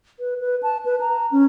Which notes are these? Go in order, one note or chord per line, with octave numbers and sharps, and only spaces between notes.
B4
B4
A5
B4
A#5
C#4